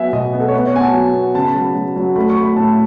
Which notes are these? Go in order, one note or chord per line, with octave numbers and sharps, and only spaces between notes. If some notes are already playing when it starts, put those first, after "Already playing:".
Already playing: F#3 B3 E5 G#5
B2 D#5
B3
A4
C#5
B3 B4
C#5
B3 G#5
A5
F#3
B3
C#3 A5
B5
F#3 A5
F#3
F#3
A3 B5
C#6
A3
B5
A2 A5